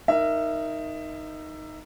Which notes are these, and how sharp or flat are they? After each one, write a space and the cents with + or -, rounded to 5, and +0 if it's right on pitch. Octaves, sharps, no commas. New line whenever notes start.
D#4 +0 A#4 +0 E5 +20